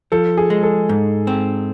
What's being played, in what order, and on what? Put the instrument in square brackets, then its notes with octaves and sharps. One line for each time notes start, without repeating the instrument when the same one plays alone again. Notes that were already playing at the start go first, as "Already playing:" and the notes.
[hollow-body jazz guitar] F3 [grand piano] A4
[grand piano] G#4
[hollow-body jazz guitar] G#3
[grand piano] A4
[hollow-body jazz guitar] G#2
C4